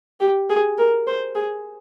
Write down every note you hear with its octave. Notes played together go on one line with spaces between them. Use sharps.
G4
G#4
A#4
C5
G#4